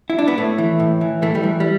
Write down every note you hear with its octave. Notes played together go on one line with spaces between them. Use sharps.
E4
D4
B3
A2 A3
E3
A2
E3
E3 A3
G3
E3
G3